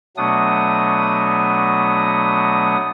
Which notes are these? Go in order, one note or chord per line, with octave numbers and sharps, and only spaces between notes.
B2 F#3 A3 B3 D4 D#6